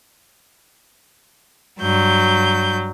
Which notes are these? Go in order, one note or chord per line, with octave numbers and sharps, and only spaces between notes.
G2 F#3 G6